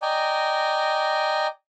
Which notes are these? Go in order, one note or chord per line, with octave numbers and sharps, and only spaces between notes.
D5 D#5 G5 G#5 A#5